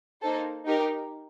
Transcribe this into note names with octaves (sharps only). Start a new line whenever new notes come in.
A#3 D#4 A4 C5
D#4 G4 A#4